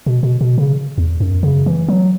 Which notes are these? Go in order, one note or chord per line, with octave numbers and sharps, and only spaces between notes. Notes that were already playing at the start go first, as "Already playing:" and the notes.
B2
B2
B2
C#3
E2
F#2
C#3
E3
F#3